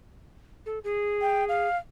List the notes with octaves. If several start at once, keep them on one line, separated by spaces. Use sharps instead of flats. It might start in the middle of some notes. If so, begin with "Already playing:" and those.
A4
G#4
G5
F5